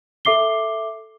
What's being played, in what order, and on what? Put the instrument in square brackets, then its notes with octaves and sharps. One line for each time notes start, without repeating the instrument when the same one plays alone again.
[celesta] A4 E5 D6 C7 G7